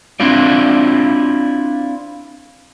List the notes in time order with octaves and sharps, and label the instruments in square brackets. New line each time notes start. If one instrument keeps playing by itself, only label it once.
[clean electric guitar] C4 D4 E4 F4 D5